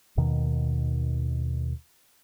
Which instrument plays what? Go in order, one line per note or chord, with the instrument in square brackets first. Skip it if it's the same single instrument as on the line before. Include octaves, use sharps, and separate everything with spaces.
[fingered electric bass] D#2 B2 D#3